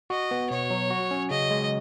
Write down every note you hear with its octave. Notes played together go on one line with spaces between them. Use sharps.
F#4 D#5
B3
B2 C#5
F#3
F#4
C#4
C#3 D#5
G#3